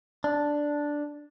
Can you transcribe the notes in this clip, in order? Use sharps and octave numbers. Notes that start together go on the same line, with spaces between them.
D4